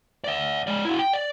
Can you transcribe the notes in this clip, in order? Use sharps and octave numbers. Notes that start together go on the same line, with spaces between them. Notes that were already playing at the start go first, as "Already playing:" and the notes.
D5 E5
G#3 D5
E4 F#4
G5
D5